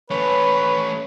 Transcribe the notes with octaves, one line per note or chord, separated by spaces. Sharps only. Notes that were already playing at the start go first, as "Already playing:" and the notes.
A3 C#4 B4 C#5